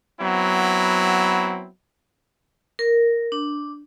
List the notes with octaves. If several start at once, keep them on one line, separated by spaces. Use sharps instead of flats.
F#3 B3 C4 E4
A#4
D4